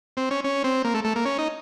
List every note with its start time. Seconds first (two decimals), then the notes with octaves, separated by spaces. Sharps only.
0.17 C4
0.31 C#4
0.44 C#4
0.64 C4
0.84 A#3
0.94 A3
1.04 A3
1.16 A#3
1.25 C#4
1.38 D#4